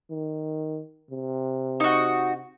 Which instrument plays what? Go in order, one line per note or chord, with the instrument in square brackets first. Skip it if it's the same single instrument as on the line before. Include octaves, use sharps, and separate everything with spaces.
[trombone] D#3
C3
[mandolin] D#4 F#4